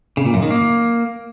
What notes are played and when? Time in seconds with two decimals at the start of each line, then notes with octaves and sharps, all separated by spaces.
0.17 C#3
0.26 A#2
0.34 F#2
0.42 D#3
0.51 A#3